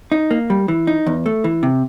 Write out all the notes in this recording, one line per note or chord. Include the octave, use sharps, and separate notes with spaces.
D#4
A#3
G3
E3
D#4
E2
A3
E3
C3